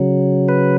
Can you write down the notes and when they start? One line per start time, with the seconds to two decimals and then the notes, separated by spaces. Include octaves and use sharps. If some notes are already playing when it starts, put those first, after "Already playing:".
Already playing: C#3 F#3
0.49 B4